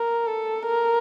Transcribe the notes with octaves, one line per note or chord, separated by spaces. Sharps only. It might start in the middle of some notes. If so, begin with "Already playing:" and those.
Already playing: A#4
A4
A#4